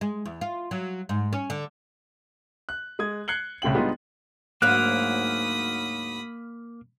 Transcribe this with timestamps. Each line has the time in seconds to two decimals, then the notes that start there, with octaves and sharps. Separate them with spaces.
0.01 G#3
0.26 E2
0.41 F4
0.71 F#3
1.09 G#2
1.33 C#4
1.50 D3
2.69 F#6
2.99 G#3 D#6 G#6
3.28 F#6 G#6 C7 C#7 F#7 G7
3.62 C2 A2 C#3 G5 F#7
3.75 G3 G#3 B3 D4 D#4 F4
4.62 D2 G#2 F#3 A#3 F5 B5 D#6 F#6